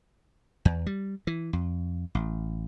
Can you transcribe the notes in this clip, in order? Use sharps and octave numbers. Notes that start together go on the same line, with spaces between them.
E2
G3
E3
F2
A1